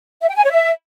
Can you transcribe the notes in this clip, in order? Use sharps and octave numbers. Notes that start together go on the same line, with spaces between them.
E5
G5
G#5
C#5
E5